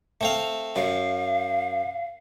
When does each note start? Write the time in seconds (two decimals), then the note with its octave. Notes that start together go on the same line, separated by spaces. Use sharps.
0.21 A3 C4 F5
0.76 F#2 F5